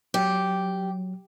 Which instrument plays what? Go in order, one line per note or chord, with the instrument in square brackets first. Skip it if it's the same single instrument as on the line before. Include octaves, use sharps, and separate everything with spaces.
[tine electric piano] F#3 [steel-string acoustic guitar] G4